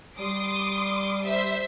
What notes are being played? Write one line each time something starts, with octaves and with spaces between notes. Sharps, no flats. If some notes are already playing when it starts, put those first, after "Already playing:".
G3 C6 D6 D#6
C5 E5